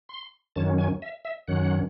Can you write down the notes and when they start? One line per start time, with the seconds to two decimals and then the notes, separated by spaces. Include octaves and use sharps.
0.09 C6
0.56 F#2 D#3 F#3 C#4 A5
0.78 G#5
1.02 E5
1.25 E5
1.48 F#2 D#3 F#3 C#4 F#5